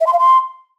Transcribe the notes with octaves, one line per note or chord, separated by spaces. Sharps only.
E5
C6
F5
C6